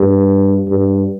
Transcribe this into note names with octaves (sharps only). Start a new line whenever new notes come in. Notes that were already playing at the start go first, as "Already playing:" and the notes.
Already playing: G2
G2